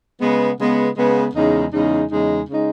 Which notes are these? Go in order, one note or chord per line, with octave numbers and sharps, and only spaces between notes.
C#3 G#3 B3
C#3 G#3 B3
C#3 G#3 B3
E2 C#3 G#3 D#4
E2 C#3 G#3 D#4
E2 C#3 G#3 D#4
C#3 G#3 D#4